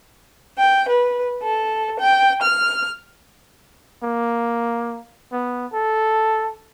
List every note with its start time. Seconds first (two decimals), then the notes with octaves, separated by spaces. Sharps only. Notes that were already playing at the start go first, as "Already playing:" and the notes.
0.57 G5
0.88 B4
1.42 A4
1.99 G5
2.42 F6
4.03 A#3
5.32 B3
5.73 A4